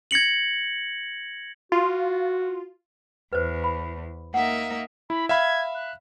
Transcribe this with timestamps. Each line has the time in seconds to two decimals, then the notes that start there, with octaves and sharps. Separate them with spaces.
0.11 G#6 A#6 C#7 F#7
1.72 F4 F#4
3.33 E2 B4 C5
3.64 B5
4.34 A#3 D#4 E5 F#5
5.10 E4 B5
5.29 E5 F5 B5 G#6
5.75 F#6